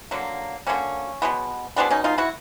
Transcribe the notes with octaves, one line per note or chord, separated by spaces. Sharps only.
D3 F#3 A#3
D3 F#3 A#3 C#4
B2 G#3 B3
B2 G#3 B3 C4 D4
C#4 D#4
D#4 F4
E4 F#4